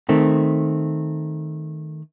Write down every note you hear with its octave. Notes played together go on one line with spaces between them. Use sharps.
D#3 A3 C4